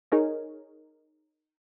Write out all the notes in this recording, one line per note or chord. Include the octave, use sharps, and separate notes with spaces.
D#4 G#4 A#4 C#5 D#5